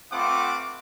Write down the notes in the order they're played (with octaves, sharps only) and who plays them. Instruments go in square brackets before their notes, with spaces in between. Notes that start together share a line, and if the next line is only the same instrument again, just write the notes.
[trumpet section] A3 C4 F4 B4 F#5 D6